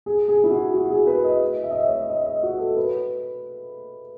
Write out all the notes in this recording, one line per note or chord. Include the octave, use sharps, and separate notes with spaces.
G#4
G#4
E4
F#4
F#4
G#4
B4
D#5
E5
D#5
E5
C#5
D#5
D#5
F#4
A4
B4